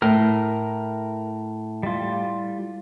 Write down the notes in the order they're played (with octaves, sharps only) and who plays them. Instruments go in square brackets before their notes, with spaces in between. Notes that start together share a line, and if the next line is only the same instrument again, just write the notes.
[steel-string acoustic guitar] A2 [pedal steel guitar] A#4 A#5 F6
[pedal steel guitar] G3 F4